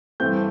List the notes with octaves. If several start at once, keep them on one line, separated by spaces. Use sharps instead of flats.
G2 E3 A3 C4 G6